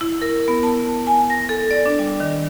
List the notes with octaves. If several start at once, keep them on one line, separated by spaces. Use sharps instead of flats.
E4
A#4
B3
A5
G#5
A#6
A4
D5
D4
G3
D#3